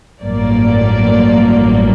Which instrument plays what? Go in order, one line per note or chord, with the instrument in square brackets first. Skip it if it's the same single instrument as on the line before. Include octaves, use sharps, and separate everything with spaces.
[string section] A1 G2 F#3 A#3 D5